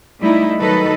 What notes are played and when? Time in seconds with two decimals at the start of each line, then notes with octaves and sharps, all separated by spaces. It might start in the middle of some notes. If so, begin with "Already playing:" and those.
0.22 G3 A3 D#4 E4
0.59 D#3 F#3 D#4 A4 B4